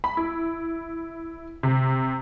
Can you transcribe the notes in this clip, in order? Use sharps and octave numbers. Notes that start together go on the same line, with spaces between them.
B5
E4
C3